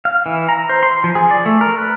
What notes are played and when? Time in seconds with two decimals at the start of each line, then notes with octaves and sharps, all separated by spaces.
0.05 F5
0.26 E3
0.49 A#5
0.69 C5
0.83 C6
1.04 F3
1.15 G#4
1.31 D5
1.46 A3
1.61 A#4
1.78 B4